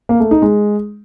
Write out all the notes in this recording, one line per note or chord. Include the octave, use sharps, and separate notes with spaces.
A#3
A3
D#4
G#3